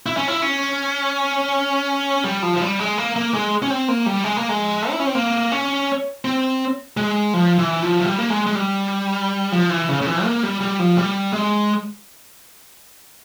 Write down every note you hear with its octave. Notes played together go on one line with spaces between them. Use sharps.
E4
C#4
E4
C#4
G3
F3
F3
G3
G#3
A#3
A#3
G#3
C#4
C4
A#3
G3
G#3
A#3
G#3
E4
C#4
C4
A#3
C#4
C4
G#3
F3
E3
F3
F3
G3
A#3
G#3
G#3
G3
F3
E3
C#3
C#3
E3
A#3
G3
G3
F3
G3
G#3